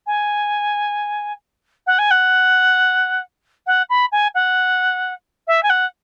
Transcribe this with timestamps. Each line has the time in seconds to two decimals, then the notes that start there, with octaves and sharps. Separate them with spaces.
0.06 G#5
1.86 F#5
1.98 G#5
2.10 F#5
3.66 F#5
3.89 B5
4.12 G#5
4.34 F#5
5.47 E5
5.63 G#5
5.69 F#5